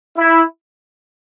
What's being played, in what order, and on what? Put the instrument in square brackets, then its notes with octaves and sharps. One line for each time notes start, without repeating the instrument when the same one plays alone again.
[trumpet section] E4